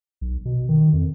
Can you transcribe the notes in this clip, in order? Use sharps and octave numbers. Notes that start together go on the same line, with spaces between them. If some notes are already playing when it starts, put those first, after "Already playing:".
B1
B2
D#3
F2